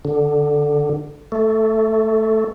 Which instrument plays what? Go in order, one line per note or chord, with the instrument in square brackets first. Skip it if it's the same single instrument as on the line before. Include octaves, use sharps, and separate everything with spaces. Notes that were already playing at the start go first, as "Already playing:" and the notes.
[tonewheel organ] D3
A3